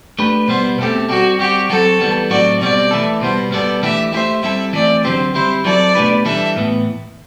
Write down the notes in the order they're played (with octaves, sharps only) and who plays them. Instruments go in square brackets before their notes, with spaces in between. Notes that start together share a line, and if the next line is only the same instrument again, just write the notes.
[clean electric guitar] A3 D4 G4 B4
[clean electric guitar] B2 G3 B3 [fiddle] C5
[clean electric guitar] B2 A3 C4 G4 [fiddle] A4
[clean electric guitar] G3 C4 G4 [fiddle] F#4
[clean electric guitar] G3 C4 F#4 [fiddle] G4
[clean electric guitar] F#3 C4 F#4 [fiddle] A4
[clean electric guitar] E3 G3 B3
[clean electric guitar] A2 F#3 C4 F#4 [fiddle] D5
[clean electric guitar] B2 G3 C4 [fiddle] D5
[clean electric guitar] E3 A3 E4 A4
[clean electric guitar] B2 G3 B3 [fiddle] C5
[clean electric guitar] B2 G3 B3 E4 A4 [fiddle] D5
[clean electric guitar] E3 A3 D4 G4 [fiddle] E5
[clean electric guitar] A3 C4 E4 G4 C5 [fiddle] E5
[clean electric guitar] G3 C4 E4 A4 [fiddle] E5
[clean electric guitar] E3 A3 C4 [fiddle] D5
[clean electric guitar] D3 F#3 C4 G4 [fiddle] C5
[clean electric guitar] G3 C4 E4 G4 [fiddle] C5
[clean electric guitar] F#3 C4 E4 A4 [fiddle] D5
[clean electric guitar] B2 A3 D4 G4 B4
[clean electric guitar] E3 G3 D4 A4 [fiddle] E5
[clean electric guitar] A2 E3 B3